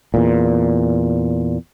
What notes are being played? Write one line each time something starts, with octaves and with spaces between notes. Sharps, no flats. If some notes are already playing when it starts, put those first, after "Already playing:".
E2 A#2